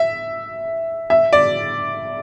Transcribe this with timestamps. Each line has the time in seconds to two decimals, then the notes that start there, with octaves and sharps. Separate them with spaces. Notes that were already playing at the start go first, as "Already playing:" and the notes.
Already playing: E5
1.10 E5
1.33 D5